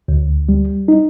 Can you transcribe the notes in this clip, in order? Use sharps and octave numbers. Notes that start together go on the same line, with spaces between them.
D2
G3
D#4